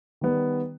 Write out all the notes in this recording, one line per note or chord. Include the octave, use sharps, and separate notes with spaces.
D#3 G3 B3